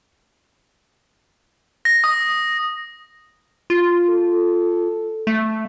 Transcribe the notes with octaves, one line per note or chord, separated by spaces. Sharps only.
A#6
D#6
F4
A4
A3